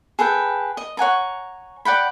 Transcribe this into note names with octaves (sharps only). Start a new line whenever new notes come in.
G#4 A4 B4 G5
D#5
C#5 F#5 G#5 A#5
D5 F#5 G5 B5